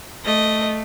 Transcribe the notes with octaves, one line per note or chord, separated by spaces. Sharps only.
A3 D#5